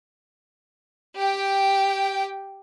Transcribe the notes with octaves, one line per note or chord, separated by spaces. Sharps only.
G4 G5